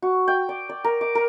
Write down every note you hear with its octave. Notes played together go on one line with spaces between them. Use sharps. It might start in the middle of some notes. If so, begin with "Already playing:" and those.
F#4
G5
D5
D5
A#4
D6
A#4